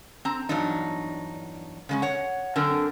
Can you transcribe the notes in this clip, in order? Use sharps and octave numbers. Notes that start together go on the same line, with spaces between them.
C4 A#5
E2 G2 F#3 D4 D#4
C#3 G#3 C#4
C#5 F#5
F#2 D3 C4 A#4